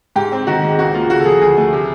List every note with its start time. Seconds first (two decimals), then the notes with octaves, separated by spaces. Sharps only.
0.16 G#2 G4
0.32 C4
0.47 D#3 F#4
0.63 G#3
0.79 C#2 F#4
0.94 A#3 F4
1.10 C#3 F#4
1.19 A4
1.26 F3 G#4
1.41 D2 G#4
1.57 A3
1.73 C3